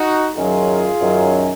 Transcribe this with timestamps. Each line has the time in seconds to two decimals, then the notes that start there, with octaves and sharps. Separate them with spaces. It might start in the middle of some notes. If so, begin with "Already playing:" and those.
Already playing: D#4 F#4
0.36 F#2 D#3 F#3 C#4 F4 G#4
1.00 F#2 D#3 F#3 C#4